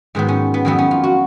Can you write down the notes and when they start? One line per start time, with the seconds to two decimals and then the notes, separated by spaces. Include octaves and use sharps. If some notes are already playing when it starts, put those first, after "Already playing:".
0.15 G#2 D#3 F#3 B3
0.29 C#4
0.54 B3
0.65 F2 D#3 F#3 B3
0.78 C#4
0.91 F4
1.04 F#4